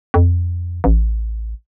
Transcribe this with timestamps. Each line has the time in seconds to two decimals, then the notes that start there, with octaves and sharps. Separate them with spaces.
0.14 F2
0.84 A1